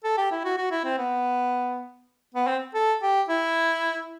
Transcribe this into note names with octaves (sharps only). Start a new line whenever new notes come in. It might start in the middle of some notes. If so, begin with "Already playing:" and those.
A4
G4
E4
F#4
F#4
E4
C4
B3
B3
C4
A4
G4
E4